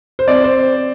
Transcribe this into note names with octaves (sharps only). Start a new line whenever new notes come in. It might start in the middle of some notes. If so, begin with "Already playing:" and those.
C5
C4 D5
C5